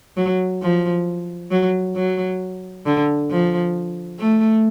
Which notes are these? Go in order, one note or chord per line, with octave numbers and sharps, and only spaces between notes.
F#3
F3
F#3
F#3
D3
F3
A3